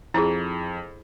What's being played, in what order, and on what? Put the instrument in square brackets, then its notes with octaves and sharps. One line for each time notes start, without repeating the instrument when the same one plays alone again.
[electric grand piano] F2 [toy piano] E4 G#4